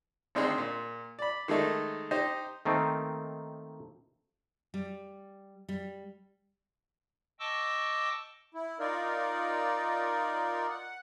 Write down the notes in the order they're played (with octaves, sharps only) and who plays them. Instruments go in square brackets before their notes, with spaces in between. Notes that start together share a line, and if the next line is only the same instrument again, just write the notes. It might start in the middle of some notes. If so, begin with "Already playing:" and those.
[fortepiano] G#1 D2 C4 D#4 G#4 C6
A#2
D5 B5
D#3 G#3 A3 D#4
D#4 G4 C5 D#5
[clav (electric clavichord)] D#3 A3 A#3 C4 D#4
[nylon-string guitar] G3
G3
[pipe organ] D#5 G5 A5 C#6 D6 E6
[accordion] E4
D#4 F4 A#4 D5
F#5